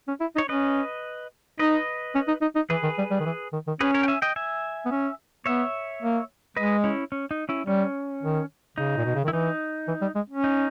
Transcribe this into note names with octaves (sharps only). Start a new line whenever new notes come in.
C#4
E4
D#4
C#5
C#4 B4 D#5
D#4 B4 D#5
C#4
D#4
D#4
D#4
E3 G#4 B4
D#3
G3
G3
D#3
E3
D#3
D#3
C#4 G#4 B4
A#4 C#5
G5
E5 G#5
D#5 G5
E5 G#5
B3
C#4
B3 C#5 E5
A#3
G#3 B4 D#5
C#4 E4
C#4
D#4
C#4 E4
G3 C#4
D#3
C#3 D#4
A#2
B2
C#3
D#3 E4
E3 D#4
E3
G3
G#3
C#4
D#4